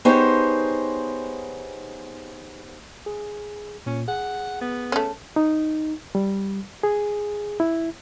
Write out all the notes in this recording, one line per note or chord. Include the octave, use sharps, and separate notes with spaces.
B3 D#4 G4 G#4 C5 C#5
G#4
A#2 C#4
G#4 F#5
B3
A3 C#4
D#4
G3
G#4
E4